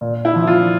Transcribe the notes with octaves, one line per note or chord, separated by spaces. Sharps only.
A#2
E4
F3
F4